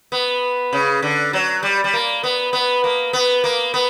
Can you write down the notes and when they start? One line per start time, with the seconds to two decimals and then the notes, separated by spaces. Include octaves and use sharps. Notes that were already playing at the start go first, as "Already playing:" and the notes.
0.12 B3
0.73 C#3
1.02 D3
1.33 F#3
1.63 G3
1.84 G3
1.93 A#3
2.23 B3
2.53 B3
2.84 A#3
3.13 B3
3.44 A#3
3.74 B3